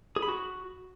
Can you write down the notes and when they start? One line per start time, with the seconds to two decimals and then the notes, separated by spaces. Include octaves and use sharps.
0.16 G#4
0.22 B5
0.29 F#4